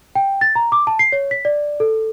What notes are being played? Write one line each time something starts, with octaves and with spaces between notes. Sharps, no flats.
G5
A6
A#5
D6
A5
C7
C#5
B6
D5
A4